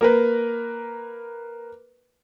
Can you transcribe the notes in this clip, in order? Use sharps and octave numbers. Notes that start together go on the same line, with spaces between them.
A#3 A#4 B4